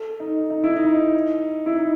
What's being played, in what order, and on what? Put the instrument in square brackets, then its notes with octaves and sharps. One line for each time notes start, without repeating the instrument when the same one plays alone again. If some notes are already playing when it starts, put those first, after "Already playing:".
Already playing: [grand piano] A4
D#4
D#4
E4
D#4
E4
D#4